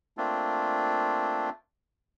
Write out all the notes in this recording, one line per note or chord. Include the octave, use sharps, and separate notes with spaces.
A3 A#3 C4 D4 F4